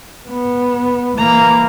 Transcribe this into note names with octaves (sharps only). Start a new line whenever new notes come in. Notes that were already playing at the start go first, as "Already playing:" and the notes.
B3
E3 A#3 A#5